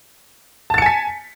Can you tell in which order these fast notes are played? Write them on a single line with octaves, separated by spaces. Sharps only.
A5 A6 C#7 G#5 B6